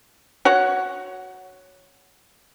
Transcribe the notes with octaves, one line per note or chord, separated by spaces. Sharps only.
F#4 C#5 F#5